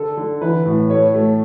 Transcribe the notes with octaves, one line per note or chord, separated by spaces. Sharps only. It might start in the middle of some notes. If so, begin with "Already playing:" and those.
Already playing: D3 A4
D3
E3 B4
A2
A3 C#5
A3